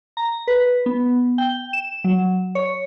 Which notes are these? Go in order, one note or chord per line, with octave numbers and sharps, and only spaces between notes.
A#5
B4
B3
G5
E7
F#3
C#5